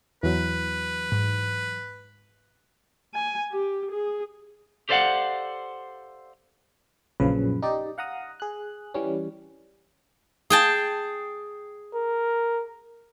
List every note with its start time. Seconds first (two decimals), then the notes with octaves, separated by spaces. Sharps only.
0.23 E2 E3 F#3 B4
1.12 G#2
3.14 G#5
3.52 G4
3.91 G#4
4.89 G4 A4 C5 D5 F5 F#5
7.20 A#1 F#2 C#3 F3 B4
7.62 D#4 G4 D5
7.98 F5 F#5 A#5 D#6
8.40 G#4 F#6
8.94 E3 G3 C#4
10.50 G#4 G5 A5
11.94 A#4